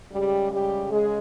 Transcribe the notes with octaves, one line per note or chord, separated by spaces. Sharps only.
C#3 G3 G#3 G4
G3 G4
G#3 G#4